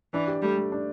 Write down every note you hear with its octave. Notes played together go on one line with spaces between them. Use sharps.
E3 D4
G4
G3 A3
A3
D4